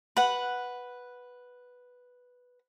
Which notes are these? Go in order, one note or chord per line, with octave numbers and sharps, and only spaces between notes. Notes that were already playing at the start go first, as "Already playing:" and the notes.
B4 F#5